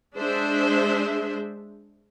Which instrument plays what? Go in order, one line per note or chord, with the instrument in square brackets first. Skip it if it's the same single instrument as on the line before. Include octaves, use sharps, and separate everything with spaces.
[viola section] G#3 D4 G#4 C5 E5